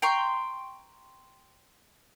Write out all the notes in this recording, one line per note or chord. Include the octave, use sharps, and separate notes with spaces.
G5 A#5 C6 C#6